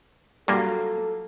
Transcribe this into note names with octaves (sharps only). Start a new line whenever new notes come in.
G2 F#3 G3 A#3 F4 A4 F5